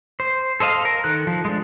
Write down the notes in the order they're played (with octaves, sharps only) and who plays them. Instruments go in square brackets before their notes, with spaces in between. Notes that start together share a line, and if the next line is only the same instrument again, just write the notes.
[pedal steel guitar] C5
A4 C5 D#5 F5
A#4
D#3 A4 F#6
F3
G#3 D4